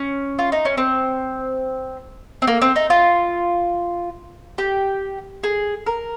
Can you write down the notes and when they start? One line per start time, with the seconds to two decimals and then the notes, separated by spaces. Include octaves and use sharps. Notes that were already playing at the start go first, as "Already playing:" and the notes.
Already playing: C#4
0.39 F4
0.52 D#4
0.65 C#4
0.78 C4
2.42 C4
2.47 A#3
2.62 C4
2.76 D#4
2.90 F4
4.58 G4
5.44 G#4
5.86 A#4